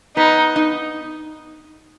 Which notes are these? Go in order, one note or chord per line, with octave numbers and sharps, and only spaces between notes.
B3 D#4
D#4